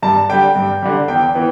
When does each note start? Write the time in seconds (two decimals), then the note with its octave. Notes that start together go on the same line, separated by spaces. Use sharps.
0.03 G2 A5
0.29 D3 G3 G5
0.55 G2
0.82 D3 G3
1.08 E2 G5
1.35 E3 B3